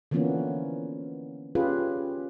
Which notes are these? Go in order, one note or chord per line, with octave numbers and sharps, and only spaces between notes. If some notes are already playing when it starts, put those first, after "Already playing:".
D3 E3 F3 A#3 B3 C#4
C#4 F4 G4 G#4 B4